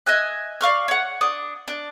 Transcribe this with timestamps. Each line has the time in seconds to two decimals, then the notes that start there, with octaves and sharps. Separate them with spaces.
0.06 D#5 E5 G#5 F#6
0.61 D5 F5 C#6 F6
0.88 C#5 F#5
1.21 D4 D#6
1.68 D4